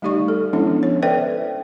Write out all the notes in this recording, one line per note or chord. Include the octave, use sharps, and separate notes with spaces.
G3 A3 D#4 G4 D5 C#6
A4
F3 G#3 B3 C#4 D4 E4
C#5
A4 B4 C5 D5 E5 G5